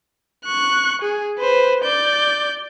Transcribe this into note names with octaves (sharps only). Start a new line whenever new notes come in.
C#6 F#6
G#4
B4 C5
D5 G6